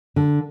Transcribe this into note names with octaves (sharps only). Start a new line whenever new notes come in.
D3